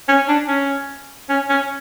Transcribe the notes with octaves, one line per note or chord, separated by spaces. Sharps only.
C#4
D4
C#4
C#4
C#4